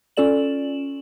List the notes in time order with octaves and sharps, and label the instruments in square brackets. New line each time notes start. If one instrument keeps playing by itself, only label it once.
[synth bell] C#4 F4 A4 D5 E7 F#7